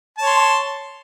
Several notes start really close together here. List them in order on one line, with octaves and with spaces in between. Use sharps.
A5 C#5 C6